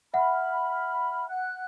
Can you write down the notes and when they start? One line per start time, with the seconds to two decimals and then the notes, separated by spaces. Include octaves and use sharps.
0.14 E5 F#5 B5 F6
1.28 F#5 F#6